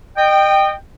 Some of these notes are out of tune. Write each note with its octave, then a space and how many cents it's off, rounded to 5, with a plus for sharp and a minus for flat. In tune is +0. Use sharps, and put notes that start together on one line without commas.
D#5 -30 G5 +0